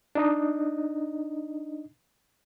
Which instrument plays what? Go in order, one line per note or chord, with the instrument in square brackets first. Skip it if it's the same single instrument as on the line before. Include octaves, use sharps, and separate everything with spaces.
[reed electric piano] D4 D#4 D#5